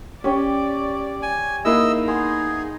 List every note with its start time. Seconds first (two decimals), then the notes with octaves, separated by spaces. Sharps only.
0.24 C#4 G4 C#5 D5 G5
1.22 G#5
1.65 A#3 D#4 E4 G#4 B4 D#5 E6
2.08 B3 G#4 C6